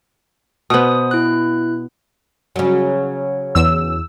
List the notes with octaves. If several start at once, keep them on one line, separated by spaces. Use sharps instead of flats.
B2 B3 C5 D#6
E4 F#6
C#3 F#3
E2 E6